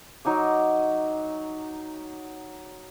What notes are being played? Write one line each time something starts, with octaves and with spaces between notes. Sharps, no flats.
F#3 D#4 G#5 D6